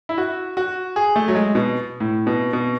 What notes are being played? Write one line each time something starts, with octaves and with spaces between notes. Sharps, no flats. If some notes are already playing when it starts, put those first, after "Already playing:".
E4
F#4
F#4
G#4
A3
F#3
G#3
B2
A2
B2
B2